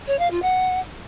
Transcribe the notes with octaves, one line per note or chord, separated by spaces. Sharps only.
C#5
F5
F4
F#5